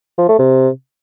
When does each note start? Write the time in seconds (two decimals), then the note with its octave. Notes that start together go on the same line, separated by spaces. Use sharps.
0.18 F3
0.28 A3
0.39 C3